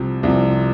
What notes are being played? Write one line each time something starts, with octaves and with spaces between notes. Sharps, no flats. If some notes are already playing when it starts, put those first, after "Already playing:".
Already playing: C2 C3 F3
C2 C3 F3